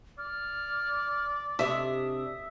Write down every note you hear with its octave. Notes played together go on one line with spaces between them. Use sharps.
D5 F6
C3 D4 E5 D#6